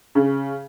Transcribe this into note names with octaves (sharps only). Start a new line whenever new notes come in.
C#3